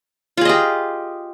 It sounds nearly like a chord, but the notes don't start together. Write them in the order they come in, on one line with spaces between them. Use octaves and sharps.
F4 G#4 D#5 G4